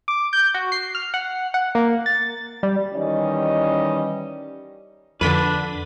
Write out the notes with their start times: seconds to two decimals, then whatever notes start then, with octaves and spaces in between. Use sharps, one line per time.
0.08 D6
0.33 G6
0.54 F#4
0.72 C7
0.95 F6
1.14 F#5
1.54 F#5
1.75 A#3
2.06 A6
2.63 G3
2.94 D#3 E3 G3 C#4 D#5
5.21 F2 D3 D4 B4 B6 D#7